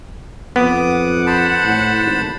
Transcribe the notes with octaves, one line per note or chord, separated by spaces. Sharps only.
F2 B3 D6 D#6
F#5
C5 A5 B5
A2
G#1